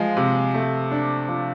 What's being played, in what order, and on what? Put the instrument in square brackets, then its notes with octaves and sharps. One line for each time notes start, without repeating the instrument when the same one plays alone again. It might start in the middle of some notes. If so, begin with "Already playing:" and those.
Already playing: [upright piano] F3 [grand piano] G#3
[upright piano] C3
A3
D4
F3